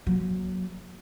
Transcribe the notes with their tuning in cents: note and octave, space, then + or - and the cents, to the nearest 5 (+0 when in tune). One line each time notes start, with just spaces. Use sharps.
F#3 +0 A#3 +20